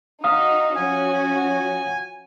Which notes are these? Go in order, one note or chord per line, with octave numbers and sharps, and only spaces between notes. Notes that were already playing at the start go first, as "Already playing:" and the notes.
D#4 F#4 F5 D#6
F3 C#4 F#4 G#5